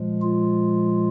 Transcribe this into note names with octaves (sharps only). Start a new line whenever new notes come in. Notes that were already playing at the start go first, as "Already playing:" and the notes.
Already playing: A#2 F3 G#3
F4